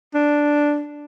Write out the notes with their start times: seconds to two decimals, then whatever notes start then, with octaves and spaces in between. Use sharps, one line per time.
0.14 D4